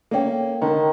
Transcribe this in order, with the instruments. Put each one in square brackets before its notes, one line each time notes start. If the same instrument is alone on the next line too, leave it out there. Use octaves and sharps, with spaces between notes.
[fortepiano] A#3 C#4 [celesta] A4 G5
[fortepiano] D3 [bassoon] D#3